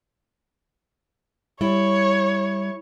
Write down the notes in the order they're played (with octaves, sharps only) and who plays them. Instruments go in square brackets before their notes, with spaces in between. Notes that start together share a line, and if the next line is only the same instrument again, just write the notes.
[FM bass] G3 [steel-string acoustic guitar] E4 [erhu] C#5